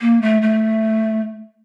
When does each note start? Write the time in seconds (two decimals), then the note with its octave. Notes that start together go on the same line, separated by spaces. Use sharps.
0.01 A#3
0.22 A3
0.42 A3